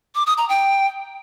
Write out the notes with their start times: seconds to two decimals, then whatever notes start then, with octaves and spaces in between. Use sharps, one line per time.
0.15 D6
0.26 D#6
0.38 A#5
0.49 G5